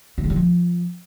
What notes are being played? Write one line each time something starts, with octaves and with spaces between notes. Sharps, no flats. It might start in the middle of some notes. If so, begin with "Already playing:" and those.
A3
G#3
G3
F3